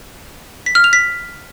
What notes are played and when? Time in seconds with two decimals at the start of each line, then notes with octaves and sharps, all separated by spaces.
0.66 B6
0.75 F6
0.84 F7
0.93 B6